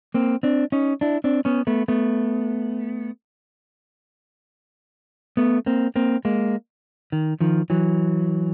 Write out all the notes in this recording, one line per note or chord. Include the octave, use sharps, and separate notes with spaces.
A#3 C4
C4 D4
C#4 D#4
D4 E4
C4 D4
B3 C#4
A3 B3
A3 B3
A3 B3
A#3 C4
A#3 C4
G#3 A#3
D#3
D#3 F3
E3 F#3